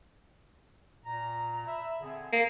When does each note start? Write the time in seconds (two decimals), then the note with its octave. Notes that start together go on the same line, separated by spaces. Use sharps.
1.05 A#2 A#5
1.67 E5 B5
2.01 D3 C4 G#4
2.32 A#3